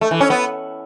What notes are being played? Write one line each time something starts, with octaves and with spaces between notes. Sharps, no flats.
A3
E3
C#4
B3